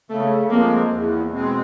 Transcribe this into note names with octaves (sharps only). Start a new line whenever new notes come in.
C#3 A3
F3 G#3 A#3 C4
E2
B2 G#3 C4